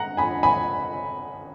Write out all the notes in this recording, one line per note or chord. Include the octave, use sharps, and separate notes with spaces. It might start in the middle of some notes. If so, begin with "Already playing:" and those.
Already playing: F#5 A#5
G#5 B5
G#5 B5